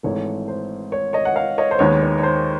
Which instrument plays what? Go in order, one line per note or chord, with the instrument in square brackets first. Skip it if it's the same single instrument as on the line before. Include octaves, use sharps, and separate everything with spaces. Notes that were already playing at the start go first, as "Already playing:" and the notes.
[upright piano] G#1 G#2 E3 A3 C#5
C5
C#5
C#5 D#5
F#5
D#5 F5
C#5 D#5
C5
D#2 D#3 G#3 B3 C#5
C#5
C#5
C5